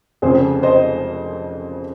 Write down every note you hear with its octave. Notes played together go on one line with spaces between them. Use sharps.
F1 F2 C#3 F3 G#4 C5
C5 D#5